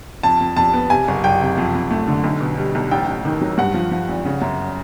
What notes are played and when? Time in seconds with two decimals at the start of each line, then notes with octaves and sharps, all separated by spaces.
0.23 F2 A5
0.41 F2
0.57 F2 A5
0.74 B3
0.90 C3 G#5
1.08 F#1
1.24 F#1 G5
1.41 C3
1.58 F2
1.74 F2
1.91 A3
2.08 D3
2.24 B1
2.41 B2
2.57 G3
2.75 B1
2.91 A1 G5
3.08 A1
3.25 D#3
3.41 F#3
3.58 G2 F#5
3.74 F3
3.92 F3
4.08 G#1
4.25 C#3
4.42 F#2